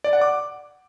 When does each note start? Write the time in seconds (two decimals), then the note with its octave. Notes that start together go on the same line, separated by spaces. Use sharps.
0.04 D5
0.13 F#5
0.21 D6